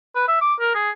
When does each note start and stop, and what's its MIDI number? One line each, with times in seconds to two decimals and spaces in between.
0.15 0.25 71
0.28 0.40 76
0.41 0.54 86
0.60 0.74 70
0.75 0.91 68